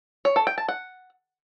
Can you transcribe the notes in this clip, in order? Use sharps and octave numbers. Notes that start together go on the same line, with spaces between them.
C#5
A4
G5
A5
F#5